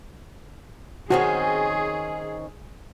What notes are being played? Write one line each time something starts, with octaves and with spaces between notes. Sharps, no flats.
D#3 C4 C#4 F#4 G#4